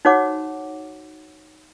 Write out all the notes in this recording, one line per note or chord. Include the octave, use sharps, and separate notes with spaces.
D#4 F#4 C5 C#5 F#5 D6